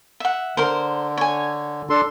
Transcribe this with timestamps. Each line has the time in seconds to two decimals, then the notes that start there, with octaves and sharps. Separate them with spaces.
0.20 E5 F#5
0.57 D3 A#4 C5
1.17 C#5 G#5
1.90 D4 A4 C6